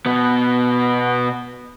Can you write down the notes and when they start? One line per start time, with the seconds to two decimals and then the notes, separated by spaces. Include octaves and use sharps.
0.06 B2 B3